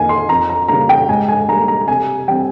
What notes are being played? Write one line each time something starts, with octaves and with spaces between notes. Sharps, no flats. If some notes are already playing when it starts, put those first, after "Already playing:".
Already playing: F2 D#3 A#3 G#5
C6
F2 A#5
A#5
C#3 G3 A#3 A#5
G5
G#2 G#5
G#5
G3 A#3 A#5
A#5
C3 G#5
G3 C4 G5